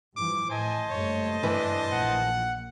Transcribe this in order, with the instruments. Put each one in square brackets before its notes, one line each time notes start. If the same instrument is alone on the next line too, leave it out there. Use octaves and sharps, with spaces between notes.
[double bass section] G2 E3 F3 [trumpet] D6
[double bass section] A2 [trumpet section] C5 D#5 A5 [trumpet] G#5
[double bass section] F#1 G2 A3 [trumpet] C#5
[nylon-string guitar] E3 B4 [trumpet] D4
[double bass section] A#1 A#2 [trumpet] F#5